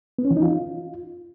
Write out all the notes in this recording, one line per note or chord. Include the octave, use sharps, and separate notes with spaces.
B3
C#4
E3
D#4
F4